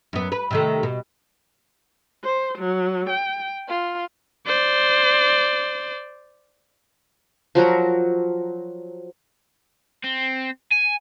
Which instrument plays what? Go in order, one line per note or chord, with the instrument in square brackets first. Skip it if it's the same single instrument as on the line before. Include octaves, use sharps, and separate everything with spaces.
[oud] F#2 B3
B4
C3 D#3 A3
B2
[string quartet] C5
F#3
G5
F4
[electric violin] C5 D5
[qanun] F3 F#3 F#4 A#4
[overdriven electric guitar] C4
G#5